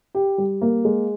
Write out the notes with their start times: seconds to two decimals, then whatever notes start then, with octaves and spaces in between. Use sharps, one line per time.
0.15 G4
0.38 G3
0.61 A#3
0.85 G#3